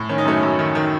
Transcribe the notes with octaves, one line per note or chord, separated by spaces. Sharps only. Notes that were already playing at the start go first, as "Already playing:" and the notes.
Already playing: A2
D#3 C#4
D#4
F#2 A3 C#4
F#2
D#3
D#3